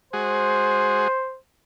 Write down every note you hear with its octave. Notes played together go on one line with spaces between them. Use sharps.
G#3 F#4 G#4 C5